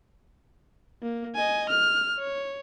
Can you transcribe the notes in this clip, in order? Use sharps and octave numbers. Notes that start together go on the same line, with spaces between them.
A#3
D#5 G#5
F6
C#5